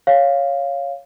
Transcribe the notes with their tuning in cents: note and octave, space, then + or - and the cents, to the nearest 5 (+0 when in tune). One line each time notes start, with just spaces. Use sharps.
C#5 +0 F5 +0